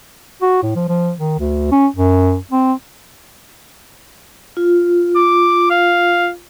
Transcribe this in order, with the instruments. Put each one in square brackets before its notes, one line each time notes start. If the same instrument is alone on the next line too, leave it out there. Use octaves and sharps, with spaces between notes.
[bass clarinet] F#4
A2
F3
F3
D#3
D2
C#4
F#2
C4
[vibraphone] F4
[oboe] D6
F5